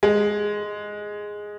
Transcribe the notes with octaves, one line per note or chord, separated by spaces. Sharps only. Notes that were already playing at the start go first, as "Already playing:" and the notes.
G#3